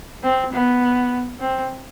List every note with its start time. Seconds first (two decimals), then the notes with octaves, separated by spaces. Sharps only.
0.23 C4
0.53 B3
1.40 C4